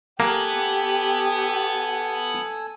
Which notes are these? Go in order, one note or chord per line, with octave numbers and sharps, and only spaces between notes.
A#3 B3 G4 A4 B4 G#5 E6